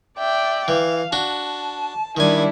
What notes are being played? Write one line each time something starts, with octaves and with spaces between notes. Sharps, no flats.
D5 E5 G5
E3 F5
D4 F#4 A5
D#3 G3 D4 E4 G#5